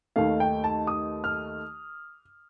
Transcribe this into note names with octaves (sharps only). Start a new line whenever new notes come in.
D#2 D#3 A3 F5
G5
A5
D#6
F6